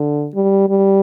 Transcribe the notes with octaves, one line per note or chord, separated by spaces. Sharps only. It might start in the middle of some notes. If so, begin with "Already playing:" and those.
Already playing: D3
G3
G3